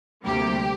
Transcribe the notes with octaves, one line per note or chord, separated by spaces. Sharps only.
D2 C3 G3 A#3 G4